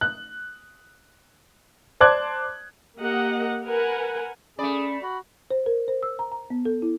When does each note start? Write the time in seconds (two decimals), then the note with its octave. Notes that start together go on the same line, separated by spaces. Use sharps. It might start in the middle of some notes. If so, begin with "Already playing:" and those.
0.01 F#6
2.00 C5 D5 A5 D6 F#6 G#6
2.97 A#3 G4 A#4 D#5 F#5
3.65 A#4 B4 F#5 G#5
4.59 A3 C#4 G#4 D5 B5
5.03 F#4 B5
5.51 C5
5.66 A#4
5.88 C5
6.03 E6
6.19 A#5
6.32 A#5
6.50 B3
6.65 A4
6.82 E4